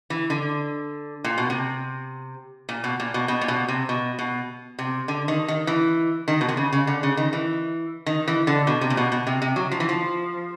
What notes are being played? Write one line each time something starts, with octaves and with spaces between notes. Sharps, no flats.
E3
D3
A#2
B2
C3
A#2
B2
A#2
B2
B2
A#2
B2
C3
B2
B2
C3
D3
D#3
D#3
E3
D#3
B2
C3
C#3
C#3
D3
C#3
D#3
E3
D#3
E3
D3
B2
C3
A#2
B2
B2
C3
C3
F#3
F3
E3
F3